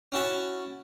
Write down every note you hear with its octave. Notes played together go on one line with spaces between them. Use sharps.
C#4 E4 F#4 A5